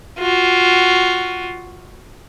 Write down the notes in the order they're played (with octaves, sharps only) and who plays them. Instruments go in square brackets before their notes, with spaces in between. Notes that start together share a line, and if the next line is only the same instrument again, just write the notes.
[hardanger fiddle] F4 F#4